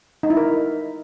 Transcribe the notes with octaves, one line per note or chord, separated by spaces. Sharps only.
D#4
E4
A#4